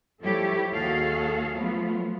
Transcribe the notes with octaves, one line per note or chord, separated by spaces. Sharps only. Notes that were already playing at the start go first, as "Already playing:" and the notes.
F3 G3 E4 G4 A4 C#5
D#2 F#4 G#4 A4 F5
F3 F#3 A3 B3 F4